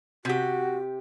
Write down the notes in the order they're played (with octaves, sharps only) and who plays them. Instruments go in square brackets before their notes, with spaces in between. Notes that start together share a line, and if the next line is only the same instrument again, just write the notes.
[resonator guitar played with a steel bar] C3 G4 [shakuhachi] F#4